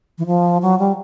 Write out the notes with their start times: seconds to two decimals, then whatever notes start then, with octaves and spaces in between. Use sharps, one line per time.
0.18 E3
0.26 F3
0.62 F#3
0.79 G3